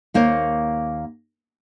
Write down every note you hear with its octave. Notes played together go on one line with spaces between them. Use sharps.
D#2 A#3 C5 C#5